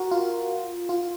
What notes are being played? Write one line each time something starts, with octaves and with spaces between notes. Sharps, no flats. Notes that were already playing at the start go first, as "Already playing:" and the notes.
Already playing: F#4 A#4
F4
F4